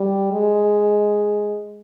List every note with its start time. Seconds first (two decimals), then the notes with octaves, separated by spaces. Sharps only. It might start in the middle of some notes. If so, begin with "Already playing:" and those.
Already playing: G3
0.32 G#3